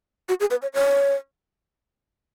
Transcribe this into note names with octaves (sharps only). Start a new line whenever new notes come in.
F#4
G#4
B4
C#5
C#5